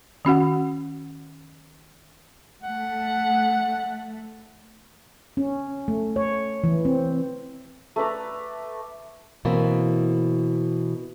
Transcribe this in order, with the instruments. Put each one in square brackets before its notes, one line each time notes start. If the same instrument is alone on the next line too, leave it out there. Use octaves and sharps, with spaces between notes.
[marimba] D#3 C#4 F#4 F#5
[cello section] A3 [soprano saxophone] F#5
[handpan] C#4
A3
C#5
E3
C4
[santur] A3 B4 D5 A#5
[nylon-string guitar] B2 E3 A#3 C4